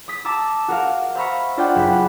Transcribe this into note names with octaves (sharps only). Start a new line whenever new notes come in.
D#6 B6
A5 A#5 D6 E6
F#4 A#4 F5
C5 E5 F5 A#5 B5 C#6
D4 F4 D5 D#5 F#5 G5
F#1 B5